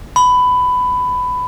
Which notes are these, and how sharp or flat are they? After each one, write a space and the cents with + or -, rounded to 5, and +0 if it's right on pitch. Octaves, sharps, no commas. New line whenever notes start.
B5 +15